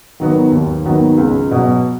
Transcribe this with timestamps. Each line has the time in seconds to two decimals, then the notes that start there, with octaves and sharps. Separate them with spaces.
0.20 D#3 F#3 B3
0.52 D#2
0.86 D#3 F#3 B3
1.18 C#2
1.51 B2 F#3